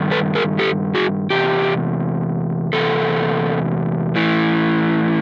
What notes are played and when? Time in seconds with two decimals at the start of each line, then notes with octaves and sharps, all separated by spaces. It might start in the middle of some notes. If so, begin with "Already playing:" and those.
Already playing: G2 D#3
0.11 A4 B4
0.35 G#4 A#4
0.59 G4 A4
0.95 F#4 G#4
1.30 E2 C3 G4
2.73 E2 C3 A4
4.15 A2 E3